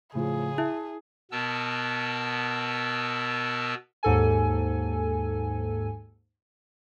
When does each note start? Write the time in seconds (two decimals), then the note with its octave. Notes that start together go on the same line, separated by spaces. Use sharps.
0.15 A2 C#3 F3 G#4
0.58 E4 E5
1.31 B2 B3 A#4 A5 E6
4.03 D#2 G#2 A4 G#5